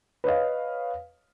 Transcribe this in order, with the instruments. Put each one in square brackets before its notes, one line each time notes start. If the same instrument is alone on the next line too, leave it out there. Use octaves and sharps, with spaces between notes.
[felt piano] B4 C#5 D#5 F5